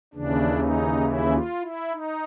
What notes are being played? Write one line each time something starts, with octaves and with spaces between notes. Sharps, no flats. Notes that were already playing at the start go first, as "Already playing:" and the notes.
D#2 C#3 E3 D4
D#4
E4
F4
E4
D#4